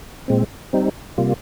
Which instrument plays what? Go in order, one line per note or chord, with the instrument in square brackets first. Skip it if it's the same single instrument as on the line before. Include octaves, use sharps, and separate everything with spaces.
[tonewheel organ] A#2 G#3 C4
G3 C4 D#4
C3 G3 A#3 F4